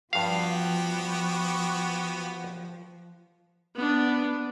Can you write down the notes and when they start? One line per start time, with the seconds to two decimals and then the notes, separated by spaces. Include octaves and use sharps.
0.13 G2 F3 B3 F#4 G4 F5
3.76 B3 D4